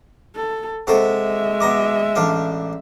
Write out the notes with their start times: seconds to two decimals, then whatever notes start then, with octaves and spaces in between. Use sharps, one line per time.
0.35 A4
0.87 C3 G#3 F#4 A4 E5
1.60 B2 A#5 D6
2.15 A1 D4 F5